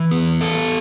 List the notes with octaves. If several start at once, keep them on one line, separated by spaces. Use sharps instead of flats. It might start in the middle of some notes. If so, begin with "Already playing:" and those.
Already playing: E3
B3
A4